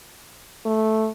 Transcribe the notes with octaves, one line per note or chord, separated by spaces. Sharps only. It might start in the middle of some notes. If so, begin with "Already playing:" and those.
A3